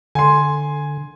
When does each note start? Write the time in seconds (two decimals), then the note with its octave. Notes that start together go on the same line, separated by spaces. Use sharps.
0.15 D3 G#5 C6